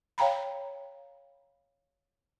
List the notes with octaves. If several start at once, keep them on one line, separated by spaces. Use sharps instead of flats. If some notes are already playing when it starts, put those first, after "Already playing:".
C#5 F5 G5 A#5 B5